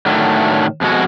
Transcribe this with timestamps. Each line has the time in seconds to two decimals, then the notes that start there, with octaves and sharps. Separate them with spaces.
0.06 A2 D3 D#3 F#3 A3
0.81 F2 B2 G#3 F#4